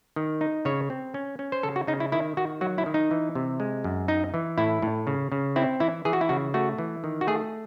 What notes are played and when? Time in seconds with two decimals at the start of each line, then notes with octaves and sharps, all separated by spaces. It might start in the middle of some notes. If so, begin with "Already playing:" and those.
0.16 D#3
0.41 D#4
0.65 C#3 C#5
0.90 C4
1.14 C#4
1.39 C#4
1.52 C5
1.63 C#3 A4
1.76 F#4
1.87 C#3 D#4
2.00 E4
2.12 D#3 E4
2.37 D#3 F#4
2.61 F#3 F#4
2.78 E4
2.86 D#3
2.94 D#4
3.11 E3
3.35 C3
3.60 G#3
3.84 F#2
4.08 D#4
4.34 E3
4.58 A2 E4
4.82 A2
5.07 C#3
5.32 C#3
5.56 C4 E4
5.80 E3 E4
6.05 E3 G#4
6.13 F#4
6.21 E4
6.29 C#3 F#4
6.54 A3 F#4
6.79 E3
7.04 D#3
7.21 F#4
7.27 A3 G#4